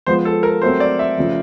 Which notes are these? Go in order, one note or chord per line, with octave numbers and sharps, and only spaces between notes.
F3 G#3 B3 C5
A4
A#4
F#3 A3 C4 C5
D5
E5
C#3 F3 A3